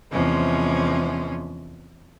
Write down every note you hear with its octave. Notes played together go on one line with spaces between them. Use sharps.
E2 C3 F3 G#3 C#4